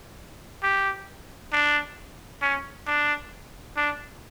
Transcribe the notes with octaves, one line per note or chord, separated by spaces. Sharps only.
G4
D4
C#4
D4
D4